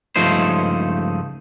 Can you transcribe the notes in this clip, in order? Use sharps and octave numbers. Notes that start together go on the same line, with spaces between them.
C#2 G2 F3 A3 D#4 C5